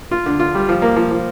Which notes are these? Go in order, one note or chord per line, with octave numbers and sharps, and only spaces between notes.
F4
D3
F4
G3
F3
A#3
F3
F3